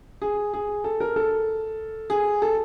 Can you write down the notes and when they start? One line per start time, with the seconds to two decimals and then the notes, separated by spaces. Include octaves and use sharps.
0.22 G#4
0.53 G#4
0.84 A4
1.00 A#4
1.16 A4
2.10 G#4
2.42 A4